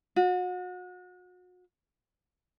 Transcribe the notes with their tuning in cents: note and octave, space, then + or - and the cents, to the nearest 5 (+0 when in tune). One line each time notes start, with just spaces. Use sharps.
F#4 -35